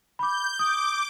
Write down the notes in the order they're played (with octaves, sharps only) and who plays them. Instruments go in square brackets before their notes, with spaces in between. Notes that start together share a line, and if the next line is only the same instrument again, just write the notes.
[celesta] B5 D6 [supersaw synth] G6
[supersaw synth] D6 [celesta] D#6